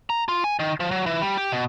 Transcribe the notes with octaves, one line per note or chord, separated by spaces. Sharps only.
A#5
F4
G#5
D#3
F3
F#3
E3
G3
G4
B2